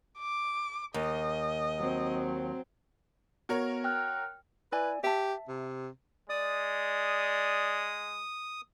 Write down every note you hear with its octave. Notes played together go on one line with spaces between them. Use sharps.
D6
D#2 D#5
F#3 C4
B3 F#4 A#4 C#5
G5 F6 F#6
E4 B4 D5 G#5
G4 E5 A5
C3
G#3 D5 D#6